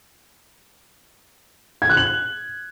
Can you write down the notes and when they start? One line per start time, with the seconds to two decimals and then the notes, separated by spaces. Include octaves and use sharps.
1.82 G#6
1.89 F#6
1.97 F#7